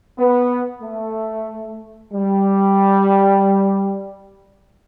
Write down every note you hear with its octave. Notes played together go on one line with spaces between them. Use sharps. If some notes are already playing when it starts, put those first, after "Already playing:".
B3
A3
G3